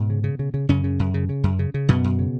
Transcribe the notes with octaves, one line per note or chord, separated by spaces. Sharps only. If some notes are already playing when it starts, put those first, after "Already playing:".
Already playing: G#2 B2 B3
C#3
C#3
C#3
C#3
F#2 C#3 C#4
C#3
F#2
C#3
C#3
F#2
C#3
C#3
F#2 B2 B3
F#2
C#3